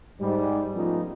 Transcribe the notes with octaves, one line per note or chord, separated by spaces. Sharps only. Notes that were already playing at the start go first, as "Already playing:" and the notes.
G#2 G3
F3 A3 B3 C#4 D#4 F4